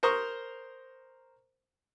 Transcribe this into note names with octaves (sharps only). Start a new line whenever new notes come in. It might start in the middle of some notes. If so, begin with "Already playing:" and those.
A#4 C5 A#5 C#6 D#6